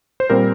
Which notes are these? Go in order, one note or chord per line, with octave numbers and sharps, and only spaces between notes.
C5
A#2 G3 C4 A#4